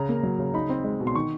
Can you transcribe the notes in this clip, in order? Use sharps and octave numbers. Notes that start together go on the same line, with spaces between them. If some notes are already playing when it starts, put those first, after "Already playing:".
Already playing: C#3 A#5
A#3
F#3
C#3
D#4 B5
C4
G#3
B2
C6
D#3 C#6